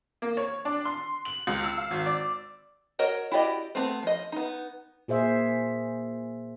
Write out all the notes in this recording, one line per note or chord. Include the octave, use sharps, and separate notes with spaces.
A#3
C#5
D4
C6
F#7
C#2
E6
F5
G#1
D5
F#4 A#4 C#5 D#5
E4 F#4 G4 D5 D#5
A3 B3 C4
F3 D#5
B3 D#4
A#2 G#4 C5 E5